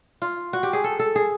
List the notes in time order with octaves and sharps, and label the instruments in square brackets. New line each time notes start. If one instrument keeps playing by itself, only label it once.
[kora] F4
F#4
G4
G#4
A4
A4
G#4